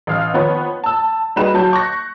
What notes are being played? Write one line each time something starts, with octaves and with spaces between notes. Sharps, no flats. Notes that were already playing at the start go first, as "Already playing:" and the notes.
A1 F5 F6
D#3 F3 B3 B4 C#5
A5 E6
G3 D#4 F#4 G#4 B4 E7
F#3 A5 G6
C#6 F#6 A#6